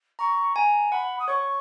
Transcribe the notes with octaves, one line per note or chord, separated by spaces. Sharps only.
A#5 C#6
G#5 A#5
F#5 B5
D#6
C#5 C#6